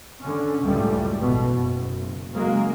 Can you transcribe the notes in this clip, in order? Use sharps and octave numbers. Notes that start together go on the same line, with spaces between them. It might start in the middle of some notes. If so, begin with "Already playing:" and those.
D3 C#4
C#2 F#2 A2 G3 A3
A1 B2
F#1
C#3 F#3 G#3 A#3